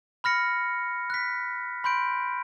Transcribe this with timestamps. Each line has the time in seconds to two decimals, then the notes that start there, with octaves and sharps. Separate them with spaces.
0.24 B5 F6 A#6 C#7
1.10 F#6 B6
1.84 B5 C6 G6 D7